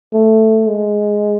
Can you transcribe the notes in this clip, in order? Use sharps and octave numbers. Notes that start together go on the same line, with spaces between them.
A3
G#3